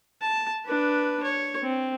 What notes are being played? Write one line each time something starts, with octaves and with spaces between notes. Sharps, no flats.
A5
D4 B4
C#5
C4